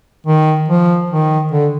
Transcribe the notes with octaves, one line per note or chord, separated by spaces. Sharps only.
D#3
F3
D#3
D3